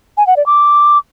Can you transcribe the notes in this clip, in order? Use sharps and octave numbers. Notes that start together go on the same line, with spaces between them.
G#5
F#5
D5
D6